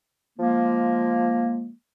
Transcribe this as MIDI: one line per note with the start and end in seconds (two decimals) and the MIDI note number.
0.38 1.70 53
0.38 1.70 56
0.38 1.70 58